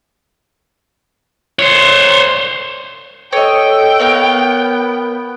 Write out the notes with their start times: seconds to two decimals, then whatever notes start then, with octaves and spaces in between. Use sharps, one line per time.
1.59 C5 C#5
3.33 A4 C#5 D#5 G5
4.00 B3 A#4 C#5 F5